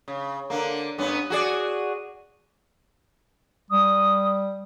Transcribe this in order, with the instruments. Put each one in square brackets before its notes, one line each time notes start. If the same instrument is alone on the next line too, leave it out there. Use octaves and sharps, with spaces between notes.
[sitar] C#3
D3 A#3
G2 B3 C#4
F#4 G#4 D5
[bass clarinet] G3 [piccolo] D#6